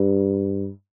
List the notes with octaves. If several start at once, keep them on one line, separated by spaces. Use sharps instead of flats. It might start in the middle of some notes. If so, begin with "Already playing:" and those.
Already playing: G2